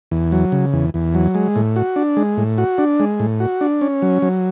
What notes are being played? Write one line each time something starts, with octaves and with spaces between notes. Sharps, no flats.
E2
F#3
C#3
E2
E2
F#3
G#3
A2
F#4
D4
G#3
A2
F#4
D4
G#3
A2
F#4
D4
C#4
F#3
F#3